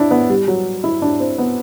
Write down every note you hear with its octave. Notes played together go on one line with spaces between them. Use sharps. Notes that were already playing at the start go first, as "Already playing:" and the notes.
Already playing: D4 E4
B3
G3
F#3
E4
D4
C4
B3